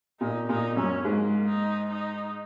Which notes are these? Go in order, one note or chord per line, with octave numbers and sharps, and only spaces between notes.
A#2 D#4
A#2 D#4
F#2 C#4
G#2 A#3
D#4
D#4